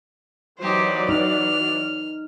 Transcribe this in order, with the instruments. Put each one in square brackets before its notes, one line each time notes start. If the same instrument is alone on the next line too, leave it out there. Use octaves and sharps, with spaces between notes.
[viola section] E3 F#3 D5 [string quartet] D#4 G4 C5
[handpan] D#4 [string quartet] F6